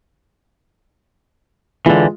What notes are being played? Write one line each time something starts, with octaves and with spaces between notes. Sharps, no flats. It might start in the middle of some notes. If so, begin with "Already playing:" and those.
D3 E3 G#3 F4